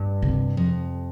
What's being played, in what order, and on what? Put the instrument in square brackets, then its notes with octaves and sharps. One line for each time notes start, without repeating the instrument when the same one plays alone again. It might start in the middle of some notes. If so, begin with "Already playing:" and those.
Already playing: [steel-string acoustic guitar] G2
[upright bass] C3
[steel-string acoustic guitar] F2